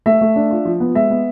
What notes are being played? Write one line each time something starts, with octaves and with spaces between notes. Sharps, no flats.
A3 E5
A3
D4
F4
F3
B3
G#3 E5
B3